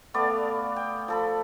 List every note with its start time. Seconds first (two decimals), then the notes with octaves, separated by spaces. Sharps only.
0.14 A3 B3 D5 F5
0.76 G5
1.08 F3 A4 B5